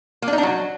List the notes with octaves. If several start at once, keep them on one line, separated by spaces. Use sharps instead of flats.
A#3
D4
D#4
D4
F#3